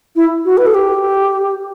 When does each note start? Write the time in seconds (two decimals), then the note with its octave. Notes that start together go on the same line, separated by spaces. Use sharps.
0.16 E4
0.45 F#4
0.57 B4
0.66 A4
0.74 G4